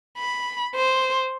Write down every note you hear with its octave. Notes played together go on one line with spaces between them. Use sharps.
B5
C5